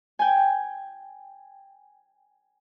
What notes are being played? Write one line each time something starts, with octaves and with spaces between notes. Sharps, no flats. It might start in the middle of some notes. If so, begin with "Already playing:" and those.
G5 G#5